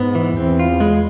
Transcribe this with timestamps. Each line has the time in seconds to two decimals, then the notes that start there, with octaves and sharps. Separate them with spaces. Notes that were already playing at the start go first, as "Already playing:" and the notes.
Already playing: G#2 B3
0.15 E3
0.37 E2 C4
0.59 F4
0.80 G#3